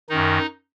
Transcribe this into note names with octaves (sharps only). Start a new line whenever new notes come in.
F#2 D#3 D#4